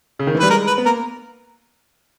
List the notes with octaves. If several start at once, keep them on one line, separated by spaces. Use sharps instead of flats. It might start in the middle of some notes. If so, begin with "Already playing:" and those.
C#3
D#3
E3
G3 B4
G#3 A#4
B4
B3
A#3 A#4